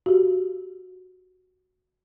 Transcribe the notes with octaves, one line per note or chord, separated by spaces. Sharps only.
F#4 G4